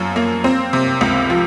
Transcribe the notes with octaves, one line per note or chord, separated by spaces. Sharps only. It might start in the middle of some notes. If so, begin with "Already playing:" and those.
Already playing: F#2 F3
A#3
C4
C3
C#2
F3